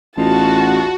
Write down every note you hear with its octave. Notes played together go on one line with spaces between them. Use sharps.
A1 E2 D#4 F4 F#4 A5